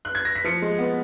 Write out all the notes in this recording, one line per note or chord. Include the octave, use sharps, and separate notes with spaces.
F#6
G#6
A#6
B6
F3 C#7
G#3
B3